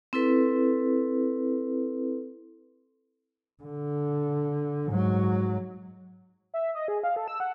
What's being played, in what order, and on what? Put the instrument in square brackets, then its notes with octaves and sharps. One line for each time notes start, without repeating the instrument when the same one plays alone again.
[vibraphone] C4 E4 A4 B4
[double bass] D3
G#2 F#3
[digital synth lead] E5
D#5
G#4
F5
A4
E6
F#5